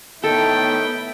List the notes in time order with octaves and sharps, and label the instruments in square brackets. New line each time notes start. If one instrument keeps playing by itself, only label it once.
[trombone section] A2 D#3 [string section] A3 B3 E4 [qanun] A4 [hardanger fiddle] G5